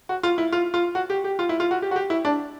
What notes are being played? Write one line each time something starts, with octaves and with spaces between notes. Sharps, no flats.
F#4
F4
E4
F4
F4
F#4
G4
G4
F4
E4
F4
F#4
G4
F#4
G4
E4
D4